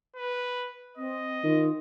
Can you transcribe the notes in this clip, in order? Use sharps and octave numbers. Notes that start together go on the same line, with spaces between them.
B4
C4 D#5
D#3 F4